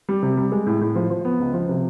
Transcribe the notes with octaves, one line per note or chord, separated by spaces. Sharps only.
G3
C3
G3
G#3
A2
A2
F3
F3
B3
C#2
F3
C3